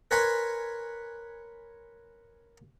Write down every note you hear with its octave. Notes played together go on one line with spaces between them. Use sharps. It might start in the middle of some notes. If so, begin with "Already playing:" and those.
A#4 B4 C#5 G#5 B5 C6